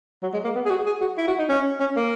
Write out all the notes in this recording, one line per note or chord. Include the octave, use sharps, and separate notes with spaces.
F#3
G#3
A#3
B3
G#4
F#4
G#4
F#4
E4
F#4
D#4
C#4
C#4
A#3